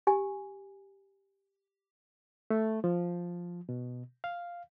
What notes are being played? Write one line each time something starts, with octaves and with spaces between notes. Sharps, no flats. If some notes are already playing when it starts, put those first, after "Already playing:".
G4 G#5
A3
F3
B2
F5